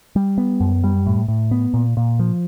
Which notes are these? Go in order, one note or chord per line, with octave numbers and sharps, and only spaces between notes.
G3
B3
F#2
G3
A2
A2
B3
A#2
A#2
F3